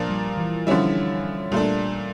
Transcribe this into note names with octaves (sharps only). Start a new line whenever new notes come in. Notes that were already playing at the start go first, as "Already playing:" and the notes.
Already playing: A#2 F3 A#3 D4
G3
E3
D3 F3 G3 C#4 E4
A#2 G3 A3 D4